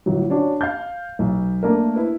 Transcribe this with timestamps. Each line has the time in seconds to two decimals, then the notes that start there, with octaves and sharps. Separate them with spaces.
0.06 G1 A2 F#3
0.30 C#4 D4 F#4
0.61 F5 G6
1.19 B1
1.63 A3 A#3 D4 A#4
1.96 E4 B4